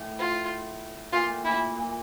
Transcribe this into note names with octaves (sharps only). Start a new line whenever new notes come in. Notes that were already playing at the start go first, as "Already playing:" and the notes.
Already playing: A2
F4
A#2 F4
A2
A#2 E4
A#2